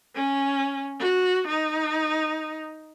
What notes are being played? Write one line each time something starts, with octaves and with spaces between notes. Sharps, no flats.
C#4
F#4
D#4